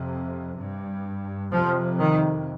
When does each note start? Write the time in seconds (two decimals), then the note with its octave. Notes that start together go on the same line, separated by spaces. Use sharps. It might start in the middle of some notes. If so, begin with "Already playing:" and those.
Already playing: F2 C3
0.57 G2
1.51 F2 C3 F3
1.99 D#3